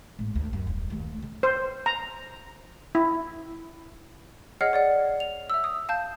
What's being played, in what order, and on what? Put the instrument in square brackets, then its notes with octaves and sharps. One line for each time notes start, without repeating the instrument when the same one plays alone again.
[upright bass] G#1 A2
D2
F#2
D#1
D#2 A3
D2 D3
[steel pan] C5
A#5
E4
[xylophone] G#4 C#5 D#5 F#5 F6 C7
C#5 D5 F#5
F7
E5 E6
D#6
F5 A5 G6